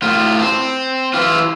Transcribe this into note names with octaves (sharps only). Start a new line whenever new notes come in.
A2 F4
C4
E3 F4